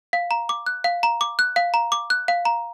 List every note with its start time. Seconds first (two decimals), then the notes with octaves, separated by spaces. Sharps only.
0.13 F5
0.31 A#5
0.49 D6
0.66 F#6
0.84 F5
1.03 A#5
1.21 D6
1.39 F#6
1.56 F5
1.74 A#5
1.92 D6
2.10 F#6
2.28 F5
2.45 A#5